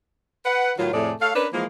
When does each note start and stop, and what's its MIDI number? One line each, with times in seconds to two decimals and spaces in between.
0.45 0.72 71
0.45 0.72 78
0.78 0.92 45
0.78 0.92 51
0.78 0.92 54
0.78 0.92 65
0.93 1.12 41
0.93 1.12 45
0.93 1.12 48
0.93 1.12 57
0.93 1.12 68
0.93 1.12 74
1.21 1.33 57
1.21 1.33 69
1.21 1.33 73
1.21 1.33 77
1.35 1.47 61
1.35 1.47 62
1.35 1.47 70
1.35 1.47 71
1.53 1.65 52
1.53 1.65 53
1.53 1.65 56
1.53 1.65 58